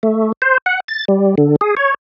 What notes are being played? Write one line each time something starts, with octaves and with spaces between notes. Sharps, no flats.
A3
C5
F#5
A6
G3
D3
G#4
C#5